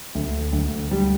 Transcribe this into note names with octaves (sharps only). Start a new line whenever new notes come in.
D2
D2
G3